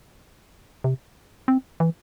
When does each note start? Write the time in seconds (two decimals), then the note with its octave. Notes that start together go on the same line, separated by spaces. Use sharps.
0.84 C3
1.48 C4
1.80 E3